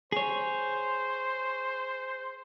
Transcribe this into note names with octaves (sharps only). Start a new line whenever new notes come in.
G#4 C5 C#5